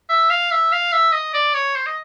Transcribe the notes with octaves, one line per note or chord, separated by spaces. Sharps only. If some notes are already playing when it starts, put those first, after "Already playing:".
E5
F5
E5
F5
E5
D#5
D5
C#5
C5
D#5